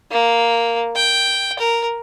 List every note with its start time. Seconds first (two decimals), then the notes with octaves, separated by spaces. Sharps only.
0.11 A#3
0.96 G5
1.59 A#4